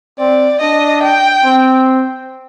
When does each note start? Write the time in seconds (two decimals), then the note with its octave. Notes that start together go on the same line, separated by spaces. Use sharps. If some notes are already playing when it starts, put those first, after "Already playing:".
0.19 C4 D5
0.61 D4 D#5
1.03 G5
1.45 C4